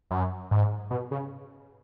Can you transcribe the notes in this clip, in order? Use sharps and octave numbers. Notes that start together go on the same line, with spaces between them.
F#2
G#2
B2
C#3